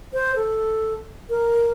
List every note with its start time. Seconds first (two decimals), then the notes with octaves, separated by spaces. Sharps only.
0.13 C5
0.36 A4
1.30 A#4